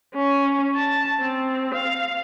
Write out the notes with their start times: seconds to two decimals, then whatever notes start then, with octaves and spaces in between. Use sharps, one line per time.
0.15 C#4
0.76 A5
1.21 C4
1.74 F5